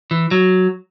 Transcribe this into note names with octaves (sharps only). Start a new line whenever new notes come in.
E3
F#3